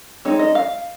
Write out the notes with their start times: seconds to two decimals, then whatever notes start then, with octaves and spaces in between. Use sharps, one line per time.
0.25 G#3 C4 D#4 C#5
0.39 D#5
0.55 F5